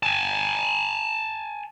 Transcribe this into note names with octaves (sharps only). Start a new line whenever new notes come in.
G#5 A5